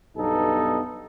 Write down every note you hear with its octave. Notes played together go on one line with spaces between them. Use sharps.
B1 G2 B3 D#4 A4